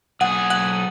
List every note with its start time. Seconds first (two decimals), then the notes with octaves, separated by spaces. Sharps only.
0.21 B1 G#4 F#5
0.50 F#5